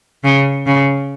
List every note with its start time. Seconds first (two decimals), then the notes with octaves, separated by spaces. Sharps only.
0.24 C#3
0.66 C#3